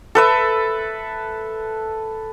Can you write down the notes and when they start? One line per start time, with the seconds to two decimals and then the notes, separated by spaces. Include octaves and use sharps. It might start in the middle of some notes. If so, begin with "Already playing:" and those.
0.15 A4 B4 E5